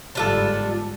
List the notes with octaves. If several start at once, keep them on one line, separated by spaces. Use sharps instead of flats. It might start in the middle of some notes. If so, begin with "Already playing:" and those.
G1 G#2 G3 D4 F4 A4